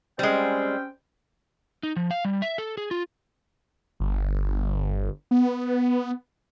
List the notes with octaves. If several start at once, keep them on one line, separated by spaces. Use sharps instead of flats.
G3 G#3 C4 C#4 G5
D#4
F3
F5
G3
E5
A4
G#4
F4
G1
B3